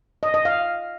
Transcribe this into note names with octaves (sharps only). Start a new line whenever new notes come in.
D#5
D#5
F5